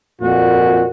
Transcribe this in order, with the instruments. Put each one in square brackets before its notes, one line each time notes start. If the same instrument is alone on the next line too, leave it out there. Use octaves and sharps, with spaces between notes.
[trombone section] F2 A#2 [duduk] F#4